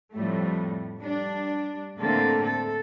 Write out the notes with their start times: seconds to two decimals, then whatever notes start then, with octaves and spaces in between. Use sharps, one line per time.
0.13 F2 A2 G3 A3
0.97 G3 D4
1.99 A2 D3 A3 A#3 C4 A4
2.43 A4